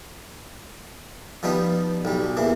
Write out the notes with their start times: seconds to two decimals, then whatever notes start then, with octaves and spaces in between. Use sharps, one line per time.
1.43 F3 G3 B3 D#4
2.05 B1 G3
2.37 E2 E3 A#3